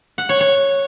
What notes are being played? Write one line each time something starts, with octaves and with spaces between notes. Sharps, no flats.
F#5
C#5
C#5